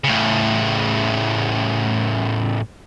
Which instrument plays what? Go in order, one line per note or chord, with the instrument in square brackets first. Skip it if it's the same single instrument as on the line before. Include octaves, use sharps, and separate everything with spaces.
[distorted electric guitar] A2 C#3